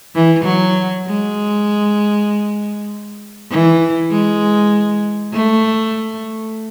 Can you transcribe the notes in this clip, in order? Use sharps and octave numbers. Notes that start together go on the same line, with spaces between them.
E3
F#3
G#3
E3
G#3
A3